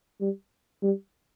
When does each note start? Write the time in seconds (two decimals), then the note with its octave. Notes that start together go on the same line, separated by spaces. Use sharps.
0.20 G3
0.83 G3